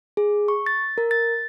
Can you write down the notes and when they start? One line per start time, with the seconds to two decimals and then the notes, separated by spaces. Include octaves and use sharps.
0.17 G#4
0.48 C#6
0.66 A6
0.98 A#4
1.11 A6